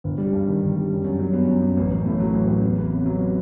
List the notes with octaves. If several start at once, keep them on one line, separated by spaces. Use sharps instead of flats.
G1
G3
G2
D#3
G1
G3
F#2
F#2
F#3
B3
F#2
F#2
A1
A1
A2
F#3
A1
A1
E2
B3
C3
F#3